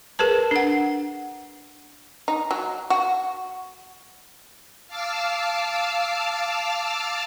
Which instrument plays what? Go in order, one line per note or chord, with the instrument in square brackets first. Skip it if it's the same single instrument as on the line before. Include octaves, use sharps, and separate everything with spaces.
[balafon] G#4 A#4 B4 A5
D4 F#5
[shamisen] D#4
F#3
F#4
[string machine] F5 A5 D6 E6 F6